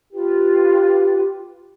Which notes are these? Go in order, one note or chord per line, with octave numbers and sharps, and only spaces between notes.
F4 G4 B4